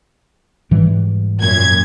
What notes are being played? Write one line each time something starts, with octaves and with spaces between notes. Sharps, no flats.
G#2 E3 G3
F#2 A#2 G#6